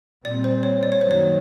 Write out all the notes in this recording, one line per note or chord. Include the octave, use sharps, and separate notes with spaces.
A#2 G3 C4 D5
C5
C#5
D5
C#5
F#2 D#3 F#3 A#3 C5
C#5